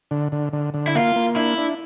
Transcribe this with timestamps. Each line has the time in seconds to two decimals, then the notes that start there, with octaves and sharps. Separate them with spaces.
0.11 D3
0.32 D3
0.53 D3
0.74 D3
0.87 E4
0.95 A#3 F4
1.16 A#3
1.36 D4 E4
1.58 D4